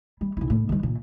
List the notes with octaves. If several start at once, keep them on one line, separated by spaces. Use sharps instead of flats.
G3
B1 E4
A2
D#3 G3
A#2